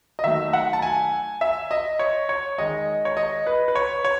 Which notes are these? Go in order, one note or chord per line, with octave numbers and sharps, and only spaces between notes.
D#5
D#3 F#3 A3 E5
F#5
A5
G#5
E5
D#5
C#5
C#5
D#3 G#3 D#5
C#5
D#5
B4
B4
C#5
C#5